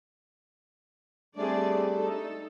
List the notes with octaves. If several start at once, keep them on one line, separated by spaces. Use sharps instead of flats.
G3 A3 C4 D4 G#4 D5
D#4 A4